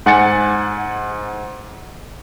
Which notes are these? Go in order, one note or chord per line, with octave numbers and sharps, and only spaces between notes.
G#2 F#5 G#5 A6 C#7